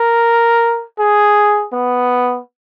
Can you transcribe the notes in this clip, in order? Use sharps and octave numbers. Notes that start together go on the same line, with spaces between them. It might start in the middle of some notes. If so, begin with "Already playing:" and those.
Already playing: A#4
G#4
B3